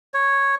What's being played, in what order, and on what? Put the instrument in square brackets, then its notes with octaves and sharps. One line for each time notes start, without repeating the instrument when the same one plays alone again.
[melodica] C#5